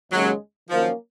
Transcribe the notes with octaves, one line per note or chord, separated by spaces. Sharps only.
D#2 C#3 F#3 G#3 C#4
D#3 F3 F#3 A#3 C#4